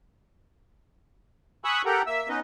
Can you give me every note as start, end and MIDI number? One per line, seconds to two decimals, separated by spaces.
1.64 1.82 80
1.64 1.82 83
1.64 1.82 85
1.64 1.82 87
1.64 1.82 88
1.64 1.82 90
1.85 2.02 67
1.85 2.02 69
1.85 2.02 70
1.85 2.02 78
1.85 2.02 79
1.85 2.02 82
2.07 2.28 58
2.07 2.28 76
2.07 2.28 88
2.29 2.40 59
2.29 2.40 61
2.29 2.40 63
2.29 2.40 71
2.29 2.40 75